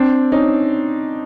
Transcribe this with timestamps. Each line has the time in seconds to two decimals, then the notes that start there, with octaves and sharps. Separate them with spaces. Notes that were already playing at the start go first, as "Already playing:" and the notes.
Already playing: C4 D4
0.32 C#4 D#4